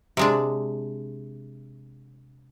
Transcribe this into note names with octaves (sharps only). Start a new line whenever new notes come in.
C3 G#3 D4